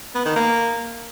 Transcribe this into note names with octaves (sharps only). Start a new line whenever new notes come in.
B3
D#3
A#3